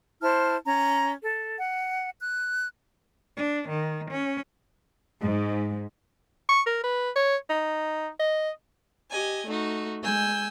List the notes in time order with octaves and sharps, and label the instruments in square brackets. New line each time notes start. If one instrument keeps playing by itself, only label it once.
[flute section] E4 C5 A5 F6
C#4 A#5
A4
F#5
F#6
[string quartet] D4
D#3
C#4
[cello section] G#2
[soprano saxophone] C#6
A#4
B4
C#5
D#4
D#5
[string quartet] G4 D#5 G#5
A3 D#4 F#4
G#3 G#5 E6 G6